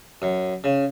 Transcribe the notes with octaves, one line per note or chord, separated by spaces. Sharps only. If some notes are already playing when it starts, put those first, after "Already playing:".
F#2
C#3